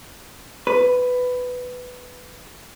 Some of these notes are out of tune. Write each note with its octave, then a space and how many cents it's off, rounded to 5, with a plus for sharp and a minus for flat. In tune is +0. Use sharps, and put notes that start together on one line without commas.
B4 +10